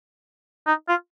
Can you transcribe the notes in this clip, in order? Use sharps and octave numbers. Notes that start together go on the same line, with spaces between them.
D#4
F4